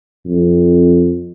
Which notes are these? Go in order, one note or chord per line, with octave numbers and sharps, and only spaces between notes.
F2